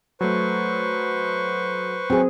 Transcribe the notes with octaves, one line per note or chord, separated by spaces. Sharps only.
F#3 A3 B4 C5 C#6
F#3 C4 G#4